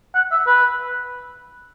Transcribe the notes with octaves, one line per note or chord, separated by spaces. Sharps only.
F#5
E5
B4